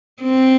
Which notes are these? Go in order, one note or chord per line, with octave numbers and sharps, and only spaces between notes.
C4